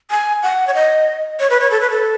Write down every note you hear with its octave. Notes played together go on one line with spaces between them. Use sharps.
G#5
F#5
C#5
D#5
C#5
B4
C#5
A4
B4
A4